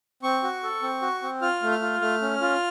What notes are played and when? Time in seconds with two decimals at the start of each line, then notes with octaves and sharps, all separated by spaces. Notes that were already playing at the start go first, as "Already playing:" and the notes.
0.23 C4 C#6
0.43 F#4
0.63 A4
0.82 C4
1.02 F#4
1.22 C4
1.42 F4 F6
1.62 A3
1.72 F6
1.82 F4
2.01 A3 F6
2.22 C#4
2.41 F4